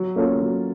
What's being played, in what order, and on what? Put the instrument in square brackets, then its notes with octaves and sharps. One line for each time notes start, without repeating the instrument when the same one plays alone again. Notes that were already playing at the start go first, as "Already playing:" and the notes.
Already playing: [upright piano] F#3
A#3 C#4 F4 A4
F#3